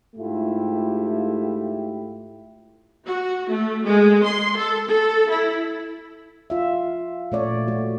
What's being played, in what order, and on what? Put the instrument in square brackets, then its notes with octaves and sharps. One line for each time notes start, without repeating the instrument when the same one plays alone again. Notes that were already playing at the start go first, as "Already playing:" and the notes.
[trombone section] G#2 A3 E4 F4 G4
[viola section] F#4
A3
G#3
C6
A4
A4
E4
[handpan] F4 E5
A#2 A3 C#5 D5
A3 F#4